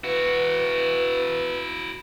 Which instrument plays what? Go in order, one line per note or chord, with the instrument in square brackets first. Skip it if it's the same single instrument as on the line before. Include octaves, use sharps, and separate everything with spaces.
[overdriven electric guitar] E4 F#4 [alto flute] B4